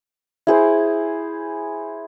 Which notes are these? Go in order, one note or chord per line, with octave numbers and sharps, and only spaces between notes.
E4 G#4 C5